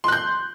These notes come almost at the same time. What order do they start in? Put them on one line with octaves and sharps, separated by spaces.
C6 F#6 G6